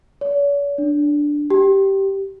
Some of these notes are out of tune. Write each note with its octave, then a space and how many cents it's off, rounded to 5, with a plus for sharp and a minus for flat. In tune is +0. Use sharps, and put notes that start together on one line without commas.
C#5 +45
D4 +0
G4 -10